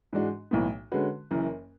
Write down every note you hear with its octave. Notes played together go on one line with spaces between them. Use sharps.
G#2 E3 G#3 D4 F#4
B1 A2 E3 B3
D3 G#3 C#4 F#4 B4
F#1 F#2 E3